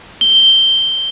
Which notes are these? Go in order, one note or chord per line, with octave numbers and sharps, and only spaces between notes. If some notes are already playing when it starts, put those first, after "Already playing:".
G7